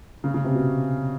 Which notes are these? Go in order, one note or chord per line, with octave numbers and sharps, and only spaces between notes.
C#3
C#3
C3
B2